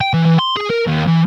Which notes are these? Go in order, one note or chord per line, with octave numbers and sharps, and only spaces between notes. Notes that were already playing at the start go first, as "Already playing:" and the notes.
G5
E3
E3
C6
G#4
A#4
D#2
E3